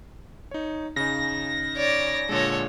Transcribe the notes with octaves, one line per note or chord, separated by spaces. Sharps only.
D#4 C#5
C#3 D#4 A#6
C#5 D5
A#2 D3 G#3 A4 C#5